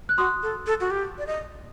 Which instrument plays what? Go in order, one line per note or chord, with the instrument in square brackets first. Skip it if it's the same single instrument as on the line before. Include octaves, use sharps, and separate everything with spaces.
[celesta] F#6
[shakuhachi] F#4 [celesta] C6 D#6
[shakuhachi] A4
A4
F#4
G4
D5
D#5